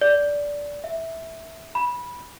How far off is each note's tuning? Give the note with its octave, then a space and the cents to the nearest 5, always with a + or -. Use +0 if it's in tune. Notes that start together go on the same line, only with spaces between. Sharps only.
D5 -10
E5 -10
B5 -15